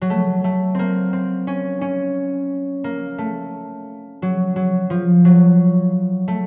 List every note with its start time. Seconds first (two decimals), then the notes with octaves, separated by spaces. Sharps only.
0.02 F#3
0.10 A3
0.44 A3
0.75 A#3 C4
1.13 C4
1.47 C#4
1.81 C#4
2.84 A#3
3.18 A3
4.22 F#3
4.56 F#3
4.90 F3
5.25 F#3
6.28 A3